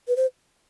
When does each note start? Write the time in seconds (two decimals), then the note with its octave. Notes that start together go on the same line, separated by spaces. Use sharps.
0.08 B4
0.16 C5